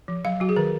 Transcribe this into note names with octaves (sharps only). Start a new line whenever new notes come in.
F3
F#3 F5
F#3 F#4
G#4
D#3 A#4